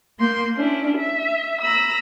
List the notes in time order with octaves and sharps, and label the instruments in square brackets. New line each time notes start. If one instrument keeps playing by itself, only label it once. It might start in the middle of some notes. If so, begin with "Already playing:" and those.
[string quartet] A#3 C6 G6
C#4 D4 E4
E5
A#5 B5 E6